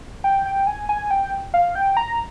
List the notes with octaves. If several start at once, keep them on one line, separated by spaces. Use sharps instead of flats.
G5
G5
G#5
G#5
G5
F5
G5
A#5